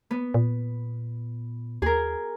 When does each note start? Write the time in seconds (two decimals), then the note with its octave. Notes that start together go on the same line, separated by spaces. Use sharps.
0.11 B3
0.34 A#2
1.82 D#2 G#4 A#4